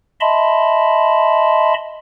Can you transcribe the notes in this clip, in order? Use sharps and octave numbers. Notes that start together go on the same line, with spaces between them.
D#5 E5 A5 B5 C6